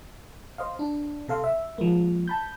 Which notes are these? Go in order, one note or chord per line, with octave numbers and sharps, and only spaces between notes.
C5 D#5 F5
D4
C3 A4 F5 C6
E5
F3 G#3 A#3
A5 B5 G6